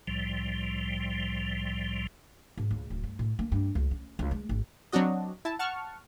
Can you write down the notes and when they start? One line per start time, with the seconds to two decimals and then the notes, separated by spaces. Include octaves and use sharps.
0.07 C2 A2 F3 G3
2.57 G#2
2.71 C#2
2.90 D1
3.04 G2
3.19 A2
3.39 A#3
3.52 G2
3.75 C#2
3.91 C#4
4.19 C#2
4.31 G#3
4.49 G#1
4.92 F#3 C4 D4 F#4 D#5
5.45 E4 A5
5.59 F#5 A5 C#6 F6